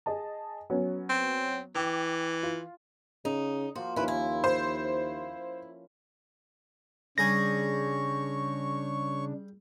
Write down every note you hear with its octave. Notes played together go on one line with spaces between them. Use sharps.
G#4 D#5 A5
F#3 B3 C#4
C4
E3 G5 D6
F4
C#3 D#4
F3 A#3 F#4 C5
D#2 F3 C#4 E4 B4
E4 F4 A#4 B4
C5
C#3 G3 D4 G#4 C#5 G#5 C#6 A#6